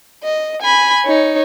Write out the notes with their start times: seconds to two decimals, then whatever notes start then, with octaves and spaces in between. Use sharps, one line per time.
0.24 D#5
0.62 G#5 B5
1.06 D#4 C#5